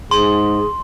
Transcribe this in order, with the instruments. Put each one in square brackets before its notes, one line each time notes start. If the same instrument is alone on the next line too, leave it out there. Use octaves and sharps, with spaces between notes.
[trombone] G#2 [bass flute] G#4 [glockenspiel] C6